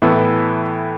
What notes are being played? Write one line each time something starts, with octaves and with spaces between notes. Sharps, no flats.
A2 E3 B3 E4 A4